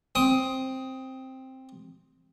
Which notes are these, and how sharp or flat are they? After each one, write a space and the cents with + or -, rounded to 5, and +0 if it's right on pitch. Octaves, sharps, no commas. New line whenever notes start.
C4 +5 D#6 +15